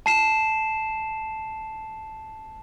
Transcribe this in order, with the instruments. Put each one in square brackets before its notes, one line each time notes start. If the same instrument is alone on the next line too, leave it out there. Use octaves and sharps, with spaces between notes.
[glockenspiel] A5 C7 E7